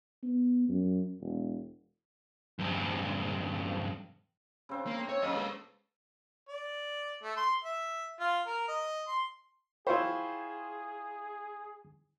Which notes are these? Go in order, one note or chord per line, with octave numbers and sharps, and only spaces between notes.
B3
F#2
E1
E2 G2
C#3 C4 D4
A#3
C#5
F#2 C#3 A#3 A4 D#5
G#3 B4
D5
A3
C6
E5
F4
A#4
D#5
C6
E4 F4 G#4 C5 G5 B5 C#6